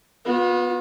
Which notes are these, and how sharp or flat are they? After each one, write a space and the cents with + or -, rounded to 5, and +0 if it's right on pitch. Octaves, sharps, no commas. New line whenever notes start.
B3 +0 F4 +45